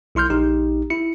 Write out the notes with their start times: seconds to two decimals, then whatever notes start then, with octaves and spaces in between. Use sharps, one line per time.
0.15 B1 E4 C6 F6 G6
0.30 A#1 D#4 G4
0.90 E4 C#7